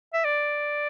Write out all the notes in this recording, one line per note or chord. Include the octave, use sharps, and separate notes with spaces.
E5
D5